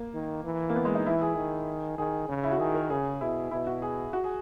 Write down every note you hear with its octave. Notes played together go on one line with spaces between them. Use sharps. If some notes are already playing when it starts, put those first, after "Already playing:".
Already playing: A#3
D#3
E3
A#3
B3
G#3
D#4
E3 E4
G#4
D#3
D#3 G#4
C#3
E4
F#4
D#3 G#4
A#4
C#3 G#4
B2 E4
B2 E4
F#4
G#4
F#4
G#4